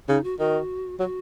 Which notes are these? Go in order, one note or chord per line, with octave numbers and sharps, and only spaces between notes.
C#3 D#4
F#4
D#3 F#4
F#3 F#4